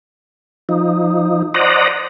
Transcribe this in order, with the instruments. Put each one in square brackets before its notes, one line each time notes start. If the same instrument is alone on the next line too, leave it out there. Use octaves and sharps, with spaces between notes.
[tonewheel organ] F3 D#4
C5 D5 D#5 F#5 A#5